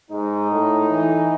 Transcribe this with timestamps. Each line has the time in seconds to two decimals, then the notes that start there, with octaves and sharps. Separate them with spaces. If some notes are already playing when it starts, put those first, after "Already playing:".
0.11 G#2 D#4
0.51 A2
0.91 E3